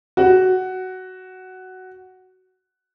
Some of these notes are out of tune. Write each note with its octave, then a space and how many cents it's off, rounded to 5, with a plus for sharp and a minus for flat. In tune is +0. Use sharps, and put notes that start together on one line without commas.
F#4 +10